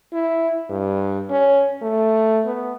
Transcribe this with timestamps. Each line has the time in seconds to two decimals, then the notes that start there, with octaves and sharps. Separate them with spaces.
0.13 E4
0.70 G2
1.30 C#4
1.82 A3
2.46 B3